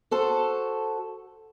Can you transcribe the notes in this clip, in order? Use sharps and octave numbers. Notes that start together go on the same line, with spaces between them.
F#4 A4 C5